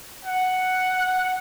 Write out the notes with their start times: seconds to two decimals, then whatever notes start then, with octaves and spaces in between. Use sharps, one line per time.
0.25 F#5